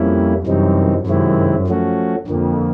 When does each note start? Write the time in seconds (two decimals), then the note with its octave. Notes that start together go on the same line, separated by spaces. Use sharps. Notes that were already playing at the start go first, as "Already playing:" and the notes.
Already playing: F2 G3 A#3 C#4 E4
0.46 F#2 C3 E3 G3 C4 D#4
1.06 F#2 C3 D#3 G#3 C4 E4
1.67 F3 A3 C#4 F#4
2.27 F2 D3 F3 A#3